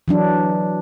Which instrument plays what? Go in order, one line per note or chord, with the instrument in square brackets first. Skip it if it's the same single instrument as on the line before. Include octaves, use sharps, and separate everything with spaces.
[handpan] E3 F#3 D4